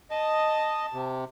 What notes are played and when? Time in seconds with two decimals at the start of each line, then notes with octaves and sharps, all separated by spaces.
0.11 D#5 A5
0.93 C3